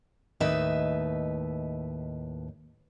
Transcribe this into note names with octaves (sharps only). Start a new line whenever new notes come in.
D#2 A2 D#4 B4 E5